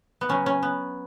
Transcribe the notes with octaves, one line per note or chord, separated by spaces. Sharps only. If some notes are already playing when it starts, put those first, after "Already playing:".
B3
C#3 F#3 C#4
C#4
B3